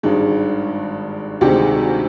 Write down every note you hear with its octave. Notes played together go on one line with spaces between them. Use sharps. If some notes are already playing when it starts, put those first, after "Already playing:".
G#1 G2 D#3 G#3
D2 C3 D#3 G#3 G4